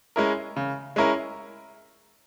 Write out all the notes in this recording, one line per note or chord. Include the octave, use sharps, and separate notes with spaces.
G#3 C#4 E4 A#4
C#3
G#3 C#4 E4 A#4